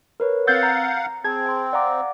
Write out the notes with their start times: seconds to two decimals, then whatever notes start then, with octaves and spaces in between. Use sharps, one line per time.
0.20 A#4 B4 C#5
0.47 C4 F5 F#5 E6 F#6 G6 A6
0.63 A#5
1.24 C4 G#4 A5 G#6
1.46 G5 C6
1.73 D5 F5 F#5 A#5 D6